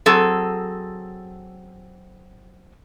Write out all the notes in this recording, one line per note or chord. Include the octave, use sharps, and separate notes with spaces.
F#3 C4 G#4 A4